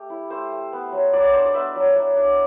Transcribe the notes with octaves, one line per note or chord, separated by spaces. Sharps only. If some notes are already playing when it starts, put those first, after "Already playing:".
Already playing: A3 G4
E4
A3 C5
A3
B3
F#3
F#3 D5
D5
D4 C5
D5
B3 E5
F#3
F#3
D4